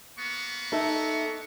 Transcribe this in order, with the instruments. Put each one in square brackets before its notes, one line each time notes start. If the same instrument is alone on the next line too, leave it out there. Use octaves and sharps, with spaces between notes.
[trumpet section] A#3 B3 C#6
[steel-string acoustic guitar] D#4 A4 E5